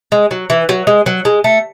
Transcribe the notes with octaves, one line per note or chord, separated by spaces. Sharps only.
G#3
F#3
E3
F#3
G#3
F#3
G#3
A3